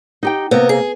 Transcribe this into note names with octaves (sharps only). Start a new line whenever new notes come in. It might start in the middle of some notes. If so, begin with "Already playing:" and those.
D#4 G4 G5
C3 A#3 B3
G#4